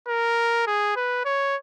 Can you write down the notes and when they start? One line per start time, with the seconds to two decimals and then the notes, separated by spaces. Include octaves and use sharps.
0.08 A#4
0.67 G#4
0.96 B4
1.25 C#5